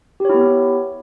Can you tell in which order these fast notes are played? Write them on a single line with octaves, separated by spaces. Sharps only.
G4 C#5 E4 B3